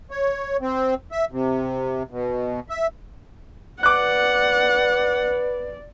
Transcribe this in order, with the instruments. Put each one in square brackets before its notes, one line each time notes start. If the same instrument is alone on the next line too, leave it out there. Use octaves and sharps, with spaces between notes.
[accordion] C#5
C4
E5
C3
B2
E5
[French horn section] B4 [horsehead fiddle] D5 [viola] F#5 [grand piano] D6 F#6